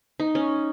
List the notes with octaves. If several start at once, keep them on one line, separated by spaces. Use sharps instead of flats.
D#4
C#4